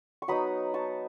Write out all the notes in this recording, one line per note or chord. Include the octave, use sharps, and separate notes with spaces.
C#6
F#3 B3 D#4 B5 D#6
A5 C#6